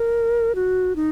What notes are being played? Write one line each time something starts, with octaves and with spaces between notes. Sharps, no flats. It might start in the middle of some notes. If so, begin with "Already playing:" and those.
Already playing: A#4
F#4
D#4